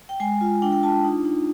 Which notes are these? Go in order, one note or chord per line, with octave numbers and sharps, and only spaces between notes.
G5
G#3 G#5
F4
D4 G5
G5
F4 A5
D#4
D#4